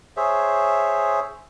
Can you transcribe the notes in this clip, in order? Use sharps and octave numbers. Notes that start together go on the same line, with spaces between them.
G#4 C5 C#5 E5